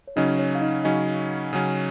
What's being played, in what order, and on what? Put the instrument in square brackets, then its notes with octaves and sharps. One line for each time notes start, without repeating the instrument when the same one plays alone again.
[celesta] C#5
[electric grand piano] C#3 F#3 C#4 [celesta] D#4 D#5
[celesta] C#5
F5
D#4 D#5
[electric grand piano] C#3 F#3 C#4 [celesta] D#4 D#5
[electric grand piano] C#3 F#3 C#4